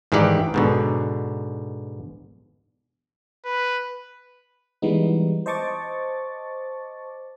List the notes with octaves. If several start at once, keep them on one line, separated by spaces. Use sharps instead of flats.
G#2 D#3 E3 G4 D5
G#2 B2 D3
B4
E3 G3 G#3 B3 D#4
C5 D#5 A5 C#6 D6 A6